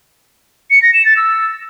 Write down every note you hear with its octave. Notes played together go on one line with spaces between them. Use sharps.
C#7
A#6
E7
A6
E6